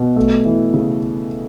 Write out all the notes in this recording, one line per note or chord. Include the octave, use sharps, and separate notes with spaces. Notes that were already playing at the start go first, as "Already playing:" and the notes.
Already playing: B2
A3
E3
C#3